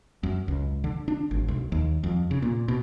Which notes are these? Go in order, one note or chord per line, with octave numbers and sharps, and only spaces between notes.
F#2
C#2
D3
D4
G#1
B1
D#2
F2
C#3
A#2
B2